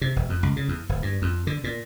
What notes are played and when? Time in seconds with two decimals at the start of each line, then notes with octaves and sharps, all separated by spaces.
0.01 C3
0.16 E1
0.29 F2
0.43 C#2
0.56 C#3
0.68 E2
0.89 D1
1.02 G2
1.22 F2
1.47 D3
1.64 A#2